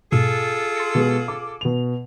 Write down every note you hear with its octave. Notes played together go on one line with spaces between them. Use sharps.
G#2 B2 F4 G#4 A4
C6 A6 C#7
B2 G#3
D6
B2 F7